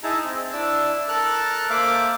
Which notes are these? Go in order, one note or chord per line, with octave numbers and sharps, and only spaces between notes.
D#4 E4 G#4 A5 A#5
C4
D4 E4 D5 A5 E6
A4 A#4 A5 F6 F#6
A#3 C5 E5 F5 D6